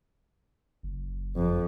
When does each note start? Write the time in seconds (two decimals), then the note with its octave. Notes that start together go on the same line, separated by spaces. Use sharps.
0.83 F#1
1.36 F2